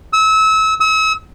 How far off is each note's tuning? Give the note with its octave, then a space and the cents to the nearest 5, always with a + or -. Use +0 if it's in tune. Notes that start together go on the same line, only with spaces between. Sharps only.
E6 -30
E6 -40